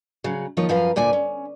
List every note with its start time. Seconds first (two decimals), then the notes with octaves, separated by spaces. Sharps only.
0.24 C#3 F#3
0.57 D#2 D#3 F3 D#4 A#4 C#5
0.69 F#2 F3 B4 F5 A#5
0.96 D2 A#2 D5 G#5
1.13 C#4